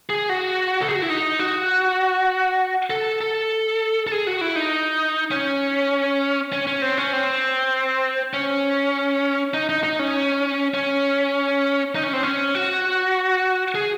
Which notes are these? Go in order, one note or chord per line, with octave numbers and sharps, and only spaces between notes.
G#4
F#4
A4
G#4
F#4
E4
D#4
F#4
A4
A4
A4
G#4
F#4
E4
D#4
C#4
C#4
C#4
C4
C#4
C4
C#4
D#4
D#4
D#4
C#4
C#4
D#4
C#4
C4
C#4
F#4
G#4